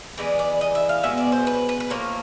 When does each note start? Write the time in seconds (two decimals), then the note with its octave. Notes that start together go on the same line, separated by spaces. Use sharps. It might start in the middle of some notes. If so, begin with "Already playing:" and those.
0.17 E3 G#3 B3 D5
0.39 D5
0.61 D#5
0.75 E5
0.89 F5
1.03 B2 G#3 B3 E5
1.18 D5
1.32 C5
1.47 B4
1.69 B4
1.80 B4
1.90 A2 F3 A#3 A#4